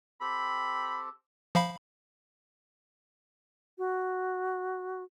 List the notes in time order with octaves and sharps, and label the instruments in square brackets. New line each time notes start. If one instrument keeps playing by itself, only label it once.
[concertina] C4 G4 A4 [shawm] B5
[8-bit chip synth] F3 F5 B5
[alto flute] F#4